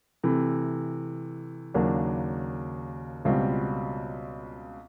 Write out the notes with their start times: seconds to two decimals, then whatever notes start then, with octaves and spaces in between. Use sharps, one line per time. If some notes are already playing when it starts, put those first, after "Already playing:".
0.23 C3 E3 A3
1.74 D#2 C#3 F#3 A#3 D4
3.25 C#2 B2 G3 C4 F4